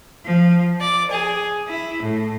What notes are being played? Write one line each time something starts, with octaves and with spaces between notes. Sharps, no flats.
F3
D5
G#4
E4
A2